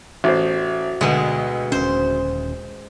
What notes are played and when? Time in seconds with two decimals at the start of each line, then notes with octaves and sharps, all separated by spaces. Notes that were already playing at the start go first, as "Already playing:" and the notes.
0.24 A1 F#4 C5
1.01 D2 B2 G#3
1.72 D#1 C#4 C5